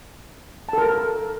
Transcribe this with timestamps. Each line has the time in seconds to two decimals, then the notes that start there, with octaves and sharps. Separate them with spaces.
0.69 A5
0.73 A4
0.78 A#4